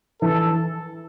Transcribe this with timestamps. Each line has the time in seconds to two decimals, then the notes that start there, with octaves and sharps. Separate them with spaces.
0.21 E3 A4